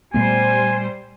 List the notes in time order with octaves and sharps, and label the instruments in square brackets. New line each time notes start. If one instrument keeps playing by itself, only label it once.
[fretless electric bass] A#2 A3 B3 [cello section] G3 C5 [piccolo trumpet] G#5